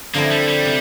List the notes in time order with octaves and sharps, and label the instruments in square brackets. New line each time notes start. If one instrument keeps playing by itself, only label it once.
[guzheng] D3 F3 A3 C4 E4 [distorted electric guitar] A#3
[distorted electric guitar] G3
G3
[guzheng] C3